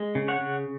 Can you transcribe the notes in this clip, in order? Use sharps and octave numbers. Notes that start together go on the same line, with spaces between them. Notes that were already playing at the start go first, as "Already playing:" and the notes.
Already playing: G#3
C#3
C#5 F#5
C#3